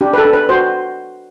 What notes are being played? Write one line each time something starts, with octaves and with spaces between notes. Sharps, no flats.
D4 G4
B4
A4
D4
B4
F#4 C5